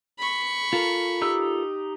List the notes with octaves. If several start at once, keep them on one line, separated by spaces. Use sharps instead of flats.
B5 C#6
F4 A4 A#4
D#4 G4 E6